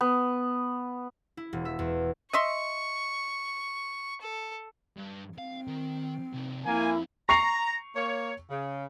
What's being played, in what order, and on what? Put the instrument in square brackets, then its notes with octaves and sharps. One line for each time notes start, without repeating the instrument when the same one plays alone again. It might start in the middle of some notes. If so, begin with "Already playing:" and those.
[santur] B3
[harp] E4
E1
E5
E2
[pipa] D#5 E5 C6 [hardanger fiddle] C#6
[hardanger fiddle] A4
[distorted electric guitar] G2
[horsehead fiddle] C4 [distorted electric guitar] F5
[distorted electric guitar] D#3
C3 D#4
[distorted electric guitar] F3 C4 [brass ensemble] A#3 G#5 [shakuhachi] E4
[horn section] A#5 [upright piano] C#6 C7 F7
[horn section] A#3 C#5
C#3